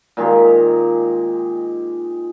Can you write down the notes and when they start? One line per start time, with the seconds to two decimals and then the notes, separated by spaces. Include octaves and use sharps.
0.17 A#2 D#3 G#3 G4